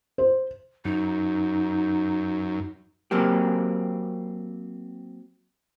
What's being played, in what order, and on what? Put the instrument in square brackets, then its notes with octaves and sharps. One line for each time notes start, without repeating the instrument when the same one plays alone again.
[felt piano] C5
[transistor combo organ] F#2 [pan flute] D#4
[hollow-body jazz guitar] F#3 A#3 C4 G4